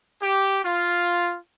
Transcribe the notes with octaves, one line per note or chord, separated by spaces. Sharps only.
G4
F4